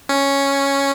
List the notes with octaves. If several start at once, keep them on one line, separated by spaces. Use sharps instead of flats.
C#4